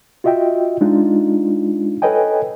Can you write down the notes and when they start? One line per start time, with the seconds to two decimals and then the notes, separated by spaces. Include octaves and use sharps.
0.24 F4 F#4 D#5 E5 G5
0.81 G#3 D4 D#4 F4
2.02 A4 B4 C#5 D#5 G5 G#5